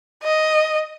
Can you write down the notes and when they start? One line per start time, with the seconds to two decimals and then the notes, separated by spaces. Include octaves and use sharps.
0.23 D#5